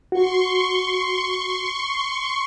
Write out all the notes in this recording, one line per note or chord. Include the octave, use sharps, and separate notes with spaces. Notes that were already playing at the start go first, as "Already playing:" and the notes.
F#4 C6 C#6